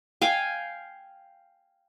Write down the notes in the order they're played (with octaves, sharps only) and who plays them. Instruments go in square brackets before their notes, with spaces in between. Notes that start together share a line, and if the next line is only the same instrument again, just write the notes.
[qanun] F5 G5 G#5